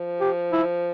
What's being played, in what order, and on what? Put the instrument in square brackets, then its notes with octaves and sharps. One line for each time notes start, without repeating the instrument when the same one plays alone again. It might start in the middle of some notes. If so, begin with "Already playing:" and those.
Already playing: [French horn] F3
[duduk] G4
E4